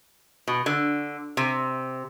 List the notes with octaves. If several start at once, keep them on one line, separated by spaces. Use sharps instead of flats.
B2
D3
C3